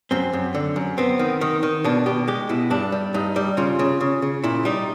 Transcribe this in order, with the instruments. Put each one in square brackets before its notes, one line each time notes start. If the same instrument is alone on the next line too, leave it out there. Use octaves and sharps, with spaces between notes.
[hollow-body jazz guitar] F#2 C4
F#2
D3
F#2
B3 C4
D#3
D#3
D#3
B2 D4
B2 G4
G#3 G4
B2 E4
G2 D4
G3
G2 D#4
G3
C#3 F4
C#3
C#3
C#3
A#2 E4
G3 D#4